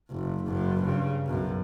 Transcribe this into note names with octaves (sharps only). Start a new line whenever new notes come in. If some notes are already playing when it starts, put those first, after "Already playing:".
F#1
F#1 F#2
G2 C#3
B1 F#2